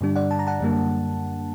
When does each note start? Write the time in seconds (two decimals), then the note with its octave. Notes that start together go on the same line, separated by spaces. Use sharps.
0.01 G2 D3 G3 D4
0.16 D5 F#5
0.31 A5
0.39 A#5
0.47 F#5 A5
0.61 F#2 D3 G3 A#3 D4